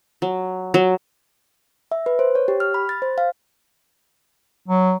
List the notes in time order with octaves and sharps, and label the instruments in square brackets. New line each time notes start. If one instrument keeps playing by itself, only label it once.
[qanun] F#3
F#3
[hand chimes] E5
B4
C5
C#5
G4
F6
B5
A6
C5
F5
[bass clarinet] F#3